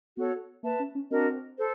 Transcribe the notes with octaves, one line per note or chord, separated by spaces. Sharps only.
B3 F#4 A4 C#5
A#3 B4 E5 A5
C#4
C#4
C4 D4 F#4 A#4 D#5
A4 C5